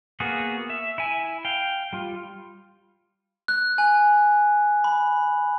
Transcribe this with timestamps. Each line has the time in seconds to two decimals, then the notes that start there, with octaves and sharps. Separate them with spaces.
0.20 A#3 B3 F#4 G#4
0.70 E5
0.98 E4 G#5
1.45 F5 G5
1.93 G3 F4
3.48 F#6
3.78 G#5
4.84 B5